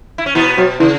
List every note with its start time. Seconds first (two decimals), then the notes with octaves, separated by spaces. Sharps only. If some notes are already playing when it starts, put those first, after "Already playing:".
0.18 E4
0.26 C#4
0.35 B2 E3 B3
0.57 B2 F#3
0.79 C#3 E3